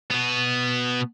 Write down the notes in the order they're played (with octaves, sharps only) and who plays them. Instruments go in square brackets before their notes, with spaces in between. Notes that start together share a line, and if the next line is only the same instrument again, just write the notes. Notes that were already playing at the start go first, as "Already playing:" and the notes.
[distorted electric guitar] B2 B3